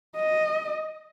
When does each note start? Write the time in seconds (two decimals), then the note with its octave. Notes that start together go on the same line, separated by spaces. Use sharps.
0.16 D#5